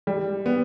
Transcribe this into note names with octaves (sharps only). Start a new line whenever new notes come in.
G3
B3